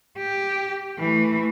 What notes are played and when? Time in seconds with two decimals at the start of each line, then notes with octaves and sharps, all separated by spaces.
0.17 G4
0.99 E3 A3